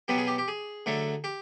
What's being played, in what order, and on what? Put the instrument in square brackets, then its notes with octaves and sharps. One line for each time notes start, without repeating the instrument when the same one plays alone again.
[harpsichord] B2 F#3 B3 G4
G#4
G4
G4
G#4
D3 F#3 A3
G4